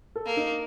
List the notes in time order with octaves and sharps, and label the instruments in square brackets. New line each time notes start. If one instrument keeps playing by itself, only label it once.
[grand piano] A4
[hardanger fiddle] A#3
[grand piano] D#4